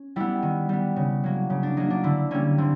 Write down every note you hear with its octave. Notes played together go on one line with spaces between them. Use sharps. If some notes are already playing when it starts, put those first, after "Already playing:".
Already playing: C#4
G3 B3 E4
D#3
G3 B3
C#3
F#3 A#3
C#3
D4
F#3 A#3 D#4
D4
D3 E4
G3 A#3 C#4
D3 C4